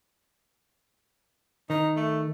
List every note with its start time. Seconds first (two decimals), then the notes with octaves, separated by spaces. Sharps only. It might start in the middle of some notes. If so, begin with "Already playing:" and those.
1.70 D#3 D#4
1.97 A3